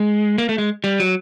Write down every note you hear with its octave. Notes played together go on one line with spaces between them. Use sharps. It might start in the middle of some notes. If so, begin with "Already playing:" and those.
Already playing: G#3
A#3
A3
G#3
G3
F#3